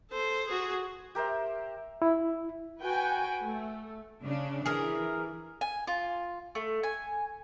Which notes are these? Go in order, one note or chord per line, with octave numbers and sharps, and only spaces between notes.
A4 C5
F#4 G#4
G4 A#4 C5 E5
E4
F#4 B4 G5 G#5
A3
C#3 D4
E3 G#4 A#4
G#5
F4
A3
G#5